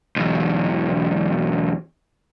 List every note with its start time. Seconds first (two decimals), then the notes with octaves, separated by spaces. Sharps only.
0.16 B1 E2